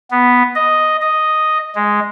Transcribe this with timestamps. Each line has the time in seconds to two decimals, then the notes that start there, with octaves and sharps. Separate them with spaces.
0.11 B3
0.55 D#5
1.01 D#5
1.75 G#3